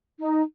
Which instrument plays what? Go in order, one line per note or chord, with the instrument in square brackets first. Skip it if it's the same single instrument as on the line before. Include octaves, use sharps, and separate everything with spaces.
[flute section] D#4